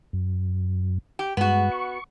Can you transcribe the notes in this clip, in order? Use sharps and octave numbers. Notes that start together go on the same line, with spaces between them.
F#2
G4
G2 G#3 B3 F#4
C#6